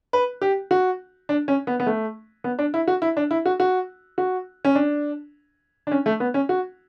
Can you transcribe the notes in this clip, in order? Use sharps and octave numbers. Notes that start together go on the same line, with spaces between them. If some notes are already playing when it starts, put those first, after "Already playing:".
B4
G4
F#4
D4
C#4
B3
B3
A3
B3
D4
E4
F#4
E4
D4
E4
F#4
F#4
F#4
C#4
D4
D4
C#4
A3
B3
C#4
F#4